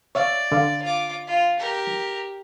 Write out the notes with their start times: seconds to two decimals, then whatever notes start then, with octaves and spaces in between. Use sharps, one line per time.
0.15 C#5 D5 E5 F5
0.52 D3 F5
0.83 F4 D6
1.27 F4
1.59 G4 A#4